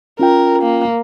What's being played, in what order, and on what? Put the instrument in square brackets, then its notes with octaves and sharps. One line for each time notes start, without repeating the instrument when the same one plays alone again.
[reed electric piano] C#4 F4 G5 [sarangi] A#4
[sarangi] A#3